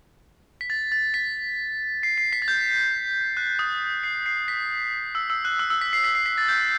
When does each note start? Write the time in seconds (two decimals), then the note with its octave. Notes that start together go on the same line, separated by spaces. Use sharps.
0.61 B6
0.70 A6
0.92 A6
1.14 B6
2.03 C7
2.18 C7
2.33 B6
2.42 A6
2.48 G6
3.37 F#6
3.59 D#6
4.04 C7
4.26 C7
4.48 B6
5.15 E6
5.30 E6
5.45 F#6
5.59 E6
5.70 E6
5.81 B6
5.93 C7
6.04 B6
6.15 C7
6.26 B6
6.38 A6
6.48 G6